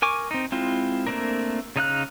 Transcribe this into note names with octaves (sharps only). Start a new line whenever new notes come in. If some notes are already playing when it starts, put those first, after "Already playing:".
A#4 G#5 C#6 D6
C4 D#4
G#3 C4 E4 F4
A3 A#3 C4 D4 A#4
C#3 D#4 F5 F#6